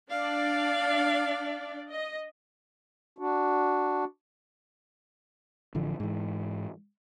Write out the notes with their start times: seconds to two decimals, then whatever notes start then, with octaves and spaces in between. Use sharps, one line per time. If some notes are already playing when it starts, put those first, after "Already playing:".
0.10 D4 D5 F5
1.89 D#5
3.18 D4 F#4
5.75 A1 D3 F3
6.00 G#2 E3